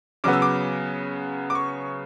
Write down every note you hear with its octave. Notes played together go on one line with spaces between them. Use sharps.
C#3 F#3 B3 D6
E6
D6
D6
C#6